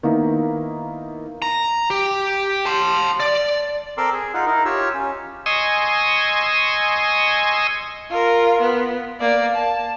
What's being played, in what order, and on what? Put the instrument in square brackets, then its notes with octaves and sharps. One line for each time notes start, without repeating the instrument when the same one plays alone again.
[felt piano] D#3 A#3 B3 D#4 E4
[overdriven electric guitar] A#5
G4
A5 C6
D5
[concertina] C4 A4 A#4 C6 D6 E6
G#4
D#4 F4 F#5
D#4 E4 A#4
F4 G4 C#5 E6
C#4
[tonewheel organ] D#5 G#5 C6 C#6 D#6 E6
[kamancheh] F4 A#4
B3
A#3 D5
A5